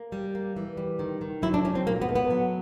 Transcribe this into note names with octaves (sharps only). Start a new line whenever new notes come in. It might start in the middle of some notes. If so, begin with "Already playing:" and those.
Already playing: A#3
G3
A#3
E3
G3
D#3
D#3
F#3 E4
D4
D#3 C#4
C4
A#2 A#3
B3
A3
B3
F#3